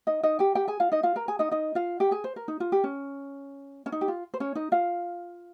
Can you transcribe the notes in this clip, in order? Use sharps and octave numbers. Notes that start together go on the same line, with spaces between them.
D#4 D#5
D#4 D#5
G4 G5
G4 G5
G#4 G#5
F4 F5
D#4 D#5
F4 F5
A#4 A#5
G#4 G#5
D#4 D#5
D#4 D#5
F4 F5
G4 G5
G#4 G#5
C5
A#4
D#4
F4
G4
C#4
C#4
D#4
G4
F4
C5
C#4 C#5
D#4 D#5
F4 F5